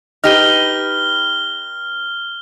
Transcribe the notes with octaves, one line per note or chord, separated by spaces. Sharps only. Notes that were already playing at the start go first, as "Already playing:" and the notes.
D#4 G4 B4 F6 G7